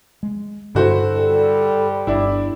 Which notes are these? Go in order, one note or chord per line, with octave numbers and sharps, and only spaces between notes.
G#3
G2 D3 E4 F#4 A4 C5
G3
G1 D4 E4